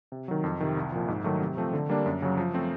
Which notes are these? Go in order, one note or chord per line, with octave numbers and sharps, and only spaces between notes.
C3
D#3 F#3
F2
C3 D#3
C2
A#2 F3
G#2
D#3 F#3 A3
C3
F3 A3 C4
D3
G3 A#3 D4
F#2
C#3 F#3
F3
A3 C4